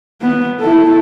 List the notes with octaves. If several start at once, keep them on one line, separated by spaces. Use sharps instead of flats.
B3
E4 A4